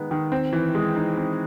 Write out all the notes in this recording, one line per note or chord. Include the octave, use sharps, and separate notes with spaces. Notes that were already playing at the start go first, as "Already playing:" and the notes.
Already playing: D#3 G#3 B3 D#4
D#3
C4
E3
G#3
D#4
C4